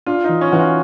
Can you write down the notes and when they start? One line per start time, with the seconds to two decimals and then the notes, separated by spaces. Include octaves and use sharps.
0.07 D4 F4
0.24 D#4
0.29 E3
0.41 C#4
0.52 E3 F#4
0.59 F4